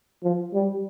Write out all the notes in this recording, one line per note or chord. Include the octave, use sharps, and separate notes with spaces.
F3
G3